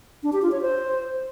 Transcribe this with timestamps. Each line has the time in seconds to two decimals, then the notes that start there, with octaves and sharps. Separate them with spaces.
0.23 D4
0.33 G4
0.42 F4
0.52 C#5
0.61 C5